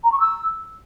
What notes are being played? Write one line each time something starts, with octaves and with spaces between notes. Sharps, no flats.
A#5
C#6
E6